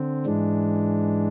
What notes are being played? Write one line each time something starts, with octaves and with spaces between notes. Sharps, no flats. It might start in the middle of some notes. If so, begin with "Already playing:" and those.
Already playing: D3 C4
G#2 E3 G#3 D4